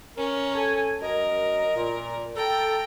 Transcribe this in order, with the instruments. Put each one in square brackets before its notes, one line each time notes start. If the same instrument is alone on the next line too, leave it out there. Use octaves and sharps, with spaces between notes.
[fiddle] C#4 [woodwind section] A#4
[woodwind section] A4 G#5
[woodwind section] F#2 D#5 [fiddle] A#4
[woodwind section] A#2
[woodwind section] A4 [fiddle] G5 A#5